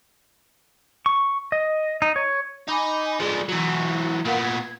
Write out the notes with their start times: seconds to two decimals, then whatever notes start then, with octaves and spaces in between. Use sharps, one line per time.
1.06 C#6
1.52 D#5
2.02 D#4
2.16 C#5
2.69 D#4 G#5 B5 D6
3.20 F3 G#3 D4 G#4 D5
3.49 E3 F#3 F#4
4.25 A#2 B3 A#4 F5 F#5
4.42 G#6